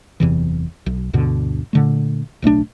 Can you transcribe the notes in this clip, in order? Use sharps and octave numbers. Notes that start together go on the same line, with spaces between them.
F#1 E2 C3 E3
B1
D2 G2 B2 D3
A#2 D3 A3
D1 B1 A3 D4